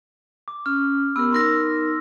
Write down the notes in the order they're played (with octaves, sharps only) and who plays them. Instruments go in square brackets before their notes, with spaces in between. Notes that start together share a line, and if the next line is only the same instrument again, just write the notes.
[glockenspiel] D6
[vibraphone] C#4 [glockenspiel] F6
[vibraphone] B3 G4 A#4 [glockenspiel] E6
[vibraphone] D#4 A#4 E6 [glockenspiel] C6 A#6